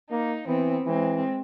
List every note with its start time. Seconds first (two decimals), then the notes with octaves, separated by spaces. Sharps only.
0.11 A#3 D#4
0.47 E3 B3 C4
0.86 E3 G#3 C4